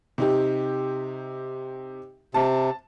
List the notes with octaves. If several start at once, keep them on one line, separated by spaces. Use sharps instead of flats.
C3 D#4 G4
C3 A5